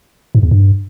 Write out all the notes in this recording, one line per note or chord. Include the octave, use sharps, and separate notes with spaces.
G#2
E2
G2